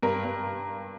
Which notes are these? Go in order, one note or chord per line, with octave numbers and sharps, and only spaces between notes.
G2 A#4
G2